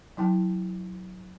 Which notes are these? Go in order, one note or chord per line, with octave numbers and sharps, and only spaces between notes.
F#3 E4 G5 A5